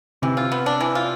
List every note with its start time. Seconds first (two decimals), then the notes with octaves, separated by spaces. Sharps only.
0.22 C3 E3
0.37 F4
0.52 B3
0.66 D4
0.81 E3
0.95 F4